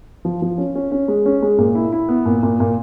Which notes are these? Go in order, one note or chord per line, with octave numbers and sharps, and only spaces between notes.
F3
F3
C#4
C#4
C#4
G#3
C#4
G#3
A#2
E4
E4
B3
A#2
A#2
A#2